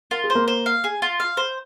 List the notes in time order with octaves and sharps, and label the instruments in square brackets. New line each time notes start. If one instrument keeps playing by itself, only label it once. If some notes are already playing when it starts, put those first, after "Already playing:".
[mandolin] F4 [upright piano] A#4
[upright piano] G#4
[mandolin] C5
[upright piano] A#3 A#4
[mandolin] C5
F5
G#4
F4
F5
C5